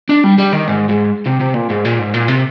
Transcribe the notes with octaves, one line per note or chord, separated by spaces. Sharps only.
D4
G3
G3
D#3
G#2
G#2
C3
C3
A#2
G#2
A#2
G#2
A#2
C3